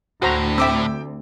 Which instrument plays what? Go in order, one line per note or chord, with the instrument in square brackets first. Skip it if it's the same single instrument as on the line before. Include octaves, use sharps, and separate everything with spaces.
[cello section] D2 [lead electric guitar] A2 [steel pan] F#4 C5 A#5
[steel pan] C4 E5 [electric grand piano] G5 D6 E6